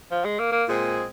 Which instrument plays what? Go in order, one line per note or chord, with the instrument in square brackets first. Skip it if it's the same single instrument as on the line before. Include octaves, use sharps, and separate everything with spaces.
[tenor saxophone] F3
G#3
A#3
A#3
[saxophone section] A#2 G#3 C4 G#4